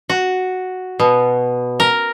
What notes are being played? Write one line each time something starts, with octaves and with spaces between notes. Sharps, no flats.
F#4
B2
A#4